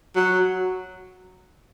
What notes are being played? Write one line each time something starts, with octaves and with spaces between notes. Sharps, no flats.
F#3